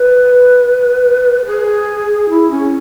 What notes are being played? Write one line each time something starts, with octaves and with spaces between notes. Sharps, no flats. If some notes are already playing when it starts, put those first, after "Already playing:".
Already playing: B4
G#4
E4
C#4